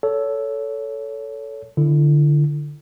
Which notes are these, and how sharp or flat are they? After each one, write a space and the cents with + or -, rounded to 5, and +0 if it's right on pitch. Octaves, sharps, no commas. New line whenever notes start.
A4 +0 C#5 +25
D3 +10 E4 +30